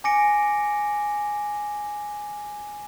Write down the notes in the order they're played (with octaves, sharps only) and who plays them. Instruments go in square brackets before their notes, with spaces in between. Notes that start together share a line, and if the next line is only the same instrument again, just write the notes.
[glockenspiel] G#5 D6 A#6 C#7 D7